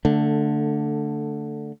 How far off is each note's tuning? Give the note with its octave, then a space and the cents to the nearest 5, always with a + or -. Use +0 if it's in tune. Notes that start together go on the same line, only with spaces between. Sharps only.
D3 +0 A3 +15